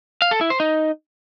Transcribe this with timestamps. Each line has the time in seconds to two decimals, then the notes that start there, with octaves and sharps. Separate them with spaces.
0.22 F5
0.31 A4
0.41 E4
0.50 C5
0.60 D#4